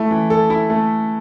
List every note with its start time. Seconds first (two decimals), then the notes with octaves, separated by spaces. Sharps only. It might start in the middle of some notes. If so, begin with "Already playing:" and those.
Already playing: A3 E4 A4
0.11 E3
0.30 A4
0.50 E4
0.70 A3